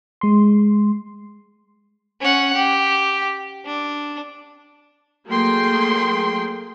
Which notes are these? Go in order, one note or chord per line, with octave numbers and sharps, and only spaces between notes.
G#3 C6
C#4 F#5
G4
D4
F#3 A3 A#3 G#4 G5 C6